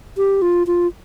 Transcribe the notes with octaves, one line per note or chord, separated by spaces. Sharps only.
G4
F4
F4